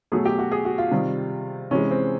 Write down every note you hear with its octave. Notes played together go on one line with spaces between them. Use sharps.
B2 F#3 A3 G#4
G4
F#4
G#4
F#4
F4
C3 D#3 G3
C3 E3 G#3 C#4
C4